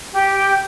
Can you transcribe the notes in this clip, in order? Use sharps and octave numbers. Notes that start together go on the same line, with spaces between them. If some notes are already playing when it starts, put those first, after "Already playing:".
G4